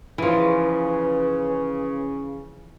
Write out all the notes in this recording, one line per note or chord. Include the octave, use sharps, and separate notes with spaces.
C#3 E3 F3 B4